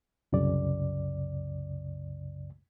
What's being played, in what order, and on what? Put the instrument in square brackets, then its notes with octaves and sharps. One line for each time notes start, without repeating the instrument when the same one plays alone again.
[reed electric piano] C2 F#2 C#3 D5